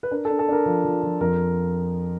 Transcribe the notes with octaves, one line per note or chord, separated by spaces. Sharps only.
B4
D4 A#4
A4
D4
A4
D4 A#4
F3
F3
F3
F2 A#4